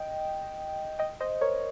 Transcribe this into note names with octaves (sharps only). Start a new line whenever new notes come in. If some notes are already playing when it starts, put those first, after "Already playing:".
Already playing: D#5 G5
D#5 G5
C5 D#5
A#4 C#5